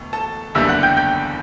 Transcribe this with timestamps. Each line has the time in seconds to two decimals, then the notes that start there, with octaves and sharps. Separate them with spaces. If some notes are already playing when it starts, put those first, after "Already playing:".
Already playing: E1 D2
0.13 A4 A5
0.55 F#1 E2 D3 G3 E5 E6
0.69 F#5 F#6
0.83 G5 G6
0.97 G5 G6